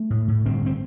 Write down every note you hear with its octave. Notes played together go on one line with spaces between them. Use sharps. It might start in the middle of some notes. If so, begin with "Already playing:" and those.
Already playing: A3
A2
A2
G1 C4
C4